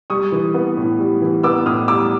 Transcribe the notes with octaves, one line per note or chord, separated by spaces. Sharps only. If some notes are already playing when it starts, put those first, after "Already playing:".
G3 C#6 D#6
E3
B3
A2
G3
E3
B3 D6 E6
A2 D#6 F6
G3 D6 E6